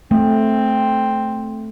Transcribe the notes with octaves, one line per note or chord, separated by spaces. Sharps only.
A3 C4